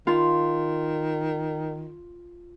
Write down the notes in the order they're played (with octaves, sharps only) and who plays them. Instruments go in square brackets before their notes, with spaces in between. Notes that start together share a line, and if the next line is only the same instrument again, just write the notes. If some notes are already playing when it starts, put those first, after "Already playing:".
[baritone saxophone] D#3 [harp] F4